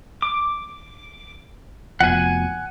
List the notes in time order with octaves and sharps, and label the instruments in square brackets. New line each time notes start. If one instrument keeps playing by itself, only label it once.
[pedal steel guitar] D6
[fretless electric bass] F1 B2 F3 [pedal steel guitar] F#5 G#5